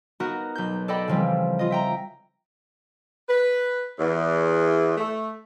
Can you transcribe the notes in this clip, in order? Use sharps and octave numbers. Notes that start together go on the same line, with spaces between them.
B3 D#4 F#4 A#4
B1 G6
A4 D5 D#5 G5 B5
C#3 E3 F3 G3 C4
F4 D#5
E5 G5 A#5
B4
E2
A3